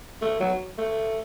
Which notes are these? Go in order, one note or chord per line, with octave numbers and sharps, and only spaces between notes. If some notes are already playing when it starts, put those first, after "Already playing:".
A3
F#3
A3